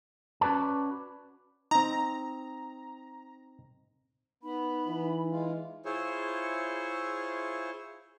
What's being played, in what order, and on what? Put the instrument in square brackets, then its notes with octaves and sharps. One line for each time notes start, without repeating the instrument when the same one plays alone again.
[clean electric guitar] C#4 F#4 B4 D5 A5
[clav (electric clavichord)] C4 D#4 [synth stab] A#5
[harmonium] B3 [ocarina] D#4 [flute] B5
[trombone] E3
[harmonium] G#3 F4
[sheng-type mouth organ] E4 F4 G#4 C5 C#5